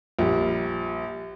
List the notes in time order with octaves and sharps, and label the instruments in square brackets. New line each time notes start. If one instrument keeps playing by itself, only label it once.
[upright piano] A#1 G3